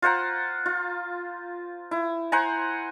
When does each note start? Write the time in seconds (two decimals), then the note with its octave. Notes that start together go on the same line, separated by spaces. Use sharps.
0.02 F4 C5 F#5 A#5
0.66 F4
1.91 E4
2.32 C5 F#5 G#5 A#5